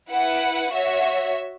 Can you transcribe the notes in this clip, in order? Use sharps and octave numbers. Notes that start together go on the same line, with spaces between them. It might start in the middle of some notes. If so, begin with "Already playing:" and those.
E4 B4 F#5
F#4 C#5 E5